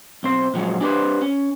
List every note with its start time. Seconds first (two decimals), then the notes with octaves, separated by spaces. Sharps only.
0.23 B1 C4 C5
0.54 A#2 F3 F#3 G#3
0.81 D4 G4 G#4 B4 C5
1.21 C#4